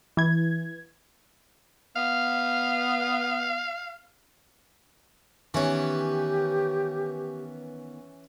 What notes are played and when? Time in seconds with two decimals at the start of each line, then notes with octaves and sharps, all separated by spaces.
0.17 E3 G#6
1.96 B3 F5
5.54 D#3 E3 B3 C#4 G4